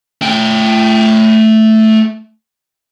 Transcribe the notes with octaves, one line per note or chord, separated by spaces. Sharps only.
A3 G5